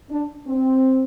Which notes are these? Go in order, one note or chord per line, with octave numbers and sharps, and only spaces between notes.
D4
C4